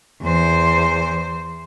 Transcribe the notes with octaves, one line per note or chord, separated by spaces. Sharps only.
E2 C5